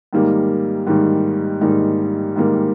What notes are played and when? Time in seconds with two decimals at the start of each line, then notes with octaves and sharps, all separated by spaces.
0.13 G#2 D#3 G3 A#3 D#4
0.87 G#2 D#3 G3 A#3 D#4
1.61 G#2 D#3 G3 A#3 D#4
2.36 G#2 D#3 G3 A#3 D#4